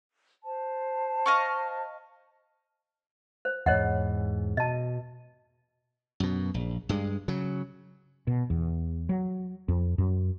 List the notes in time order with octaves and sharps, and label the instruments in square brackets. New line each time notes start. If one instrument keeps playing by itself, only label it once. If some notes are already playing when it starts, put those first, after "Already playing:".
[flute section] C5 A5
[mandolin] D#5 F5 C#6
[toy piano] C5
[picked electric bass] E2 G#2 [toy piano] C#5 D#5 F#5
[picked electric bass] B2 [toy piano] D#5 A5
[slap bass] F#2 B2
A#1
G2 G#3
C#3 F#3
[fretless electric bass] B2
E2
F#3
F2
F#2